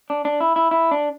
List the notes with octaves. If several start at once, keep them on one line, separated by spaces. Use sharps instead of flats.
D4
D4
E4
E4
E4
D4